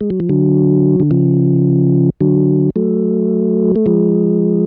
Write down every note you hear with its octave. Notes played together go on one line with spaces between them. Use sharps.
G#3
F#3
F3
D3 F#3
D3
C#3 F3
D3 F#3
F#3 A3
A3
F3 G#3